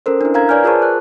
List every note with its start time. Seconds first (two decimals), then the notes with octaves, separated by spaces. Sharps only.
0.06 C#4 A4 A#4 C5
0.21 D4 E4
0.34 A#4 F5 A#5 G#6
0.48 B4 C#5 D5 G#5 F6 G6
0.64 F4 G#4 A#4 C5 A5 C#6
0.82 F#6